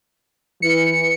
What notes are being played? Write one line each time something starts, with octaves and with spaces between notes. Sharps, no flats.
E3 C#7